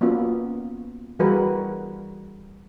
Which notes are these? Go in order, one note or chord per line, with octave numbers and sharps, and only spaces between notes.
A#3 B3 C#4 F4 F#4
E3 G3 F#4 G#4 A#4 B4